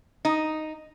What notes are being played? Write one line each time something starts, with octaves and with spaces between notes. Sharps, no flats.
D#4